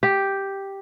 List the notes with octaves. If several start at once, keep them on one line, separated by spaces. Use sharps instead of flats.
G4